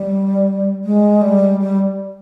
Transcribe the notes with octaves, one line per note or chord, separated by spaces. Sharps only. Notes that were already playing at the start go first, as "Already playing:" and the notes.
Already playing: G3
G#3
G3
G3